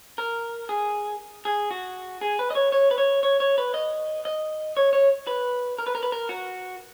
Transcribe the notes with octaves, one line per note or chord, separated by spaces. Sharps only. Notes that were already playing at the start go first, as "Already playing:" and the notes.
A#4
G#4
G#4
F#4
G#4
B4
D#5
C#5
C#5
B4
C#5
C#5
C#5
B4
D#5
D#5
C#5
C#5
B4
A#4
B4
A#4
B4
A#4
F#4